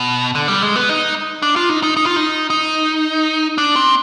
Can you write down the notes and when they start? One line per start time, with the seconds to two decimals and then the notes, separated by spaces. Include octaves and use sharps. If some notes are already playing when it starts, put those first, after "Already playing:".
Already playing: B2
0.35 D3
0.48 G3
0.62 G#3
0.76 B3
0.89 D#4
1.42 D4
1.56 F4
1.69 D#4
1.83 D#4
1.97 D#4
2.06 F4
2.16 D#4
2.50 D#4
3.58 D4
3.76 C4